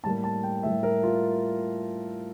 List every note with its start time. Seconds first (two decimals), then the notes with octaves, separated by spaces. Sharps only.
0.04 A2 G3 A#3 A5
0.24 A5
0.43 G5
0.63 A2 G3 A#3 E5
0.83 A#4
1.03 F4